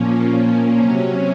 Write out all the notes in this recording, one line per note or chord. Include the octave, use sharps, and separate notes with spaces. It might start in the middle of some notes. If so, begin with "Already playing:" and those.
Already playing: A#2 F3 A#3 C#4
C3 F#3 C#4